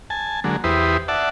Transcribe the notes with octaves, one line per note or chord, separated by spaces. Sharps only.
G#5 A5
D3 F#3 G#3 A#3
E2 E4 G4 B4 C5 D#6
D5 E5 F#5 A5